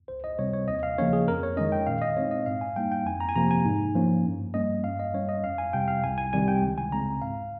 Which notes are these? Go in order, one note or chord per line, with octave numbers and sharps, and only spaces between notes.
C#2 C5
D#5
C3 G3 C4 C#5
C#5
D#2 D#5
F5
C#3 F3 A#3 C#4 C#5
G#4
F2 A#4
C#5
D#3 G#3 C#4 D#5
G5
A#2 F5
D#5
G#3 C4 D#4 C#5
D#5
G#2 F5
G#5
G3 A#3 D#4 G5
G5
F2 G#5
A#5
G#5
C3 F3 A#3 A#5
G#5
G#2
F3 A#3 C#4
G2
G3 A#3 C#4 D#5
G2 F5
D#5
G3 C#4 C#5
D#5
F2 F5
G#5
C3 G3 G5
F5
C2 G#5
G#5
C3 D#3 G3 G#5
G5
C#2
G#5
C#3 G#3 C4 A#5
G#2 F5